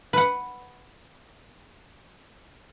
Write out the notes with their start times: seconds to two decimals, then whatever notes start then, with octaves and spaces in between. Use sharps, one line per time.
0.13 B4 F#5